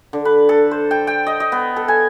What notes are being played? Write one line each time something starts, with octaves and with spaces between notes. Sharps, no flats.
D3
B4
A4
C5
G5
G5
D#5
D#5
B3
A4
G#5